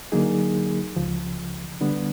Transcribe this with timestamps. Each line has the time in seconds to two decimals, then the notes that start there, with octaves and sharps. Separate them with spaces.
0.12 D3 F#3 A#3 D#4 G#4
0.96 C#2 C#3 F3
1.81 D3 G3 B3 D4